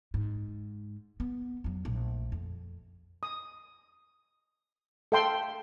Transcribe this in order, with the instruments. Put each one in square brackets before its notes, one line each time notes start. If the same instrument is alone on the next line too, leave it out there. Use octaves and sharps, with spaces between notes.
[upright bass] G#2
B3
F2 F#3
A#1 A3
F2
[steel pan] D#6
A4 E5 F5 G5 A5 C6